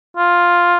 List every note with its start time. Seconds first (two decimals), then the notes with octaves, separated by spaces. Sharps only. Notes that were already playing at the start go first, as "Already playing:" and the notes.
0.17 F4